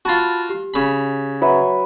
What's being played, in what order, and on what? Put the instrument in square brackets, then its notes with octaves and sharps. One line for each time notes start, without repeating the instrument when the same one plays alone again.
[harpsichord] F4 F#4 [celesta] A5 B5 A6
[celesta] G4
[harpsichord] C#3 B5
[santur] F#3 B4 E5